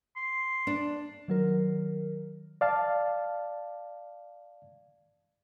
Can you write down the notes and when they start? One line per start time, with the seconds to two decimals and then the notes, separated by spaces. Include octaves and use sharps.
0.16 C6
0.67 D4
1.28 D#3 F#3 A#4
2.61 D5 F5 A5